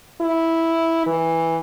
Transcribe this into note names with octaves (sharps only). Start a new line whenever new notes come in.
E4
E3